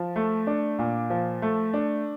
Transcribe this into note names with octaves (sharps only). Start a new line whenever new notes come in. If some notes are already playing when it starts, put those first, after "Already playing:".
Already playing: F3
A3
D4
A#2
F3
A3
D4